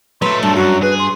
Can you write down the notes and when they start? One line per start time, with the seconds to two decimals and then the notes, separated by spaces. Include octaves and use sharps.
0.22 F#3 A3 B4 C6
0.43 G2 A5
0.56 F#2 F#4
0.82 G#4 B4
0.99 C6